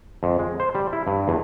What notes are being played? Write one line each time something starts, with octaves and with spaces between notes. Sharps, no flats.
F2
G#3
C5
G3
E4
G2
E2